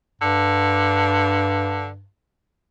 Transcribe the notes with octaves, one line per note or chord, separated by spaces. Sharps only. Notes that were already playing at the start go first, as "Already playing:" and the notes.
G2 D3